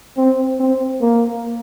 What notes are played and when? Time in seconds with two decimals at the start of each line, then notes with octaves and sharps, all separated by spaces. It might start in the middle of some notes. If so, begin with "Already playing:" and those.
0.17 C4
0.60 C4
1.01 A#3